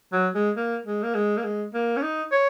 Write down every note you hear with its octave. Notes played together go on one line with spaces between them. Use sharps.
F#3
G#3
A#3
G#3
A#3
G#3
A#3
G#3
A#3
C#4
D#4
C#5